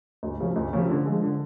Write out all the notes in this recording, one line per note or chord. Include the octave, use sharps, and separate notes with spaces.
D2
C3 F3 A3 C#4
D2
C3 F3 A3 C#4
D3
F3 G#3
D3